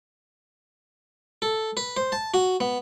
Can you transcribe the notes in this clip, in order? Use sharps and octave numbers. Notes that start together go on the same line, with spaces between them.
A4
B4
C5
A5
F#4
B3